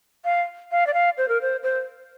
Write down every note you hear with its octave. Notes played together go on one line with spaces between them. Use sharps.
F5
F5
D5
F5
C5
A#4
C5
C5